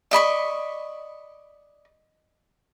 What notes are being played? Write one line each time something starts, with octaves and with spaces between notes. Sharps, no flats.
D5 D#5 B5 C#6